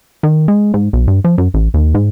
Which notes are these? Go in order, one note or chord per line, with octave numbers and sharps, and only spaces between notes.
D#3
G#3
G#2
B1
G2
F3
F#2
A1
D#2
G#2